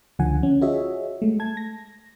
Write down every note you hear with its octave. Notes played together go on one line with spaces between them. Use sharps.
C#2 D3 F3 F#5 G#5
C#4
F4 F#4 G#4 C#5 D#5 E5
G#3 A3
A5 G#6
A#6